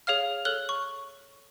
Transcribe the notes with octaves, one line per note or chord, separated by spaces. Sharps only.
G#4 C#5 F5 F6
A4 C#5 F6 F#6 F#7 G7
C#6